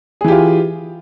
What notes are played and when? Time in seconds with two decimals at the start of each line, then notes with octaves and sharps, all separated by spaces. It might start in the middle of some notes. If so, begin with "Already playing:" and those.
0.21 G#4
0.24 E3
0.28 G4
0.32 F4